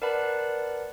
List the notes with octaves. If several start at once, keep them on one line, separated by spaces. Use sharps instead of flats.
A#4 B4 D5 F#5 A5 B5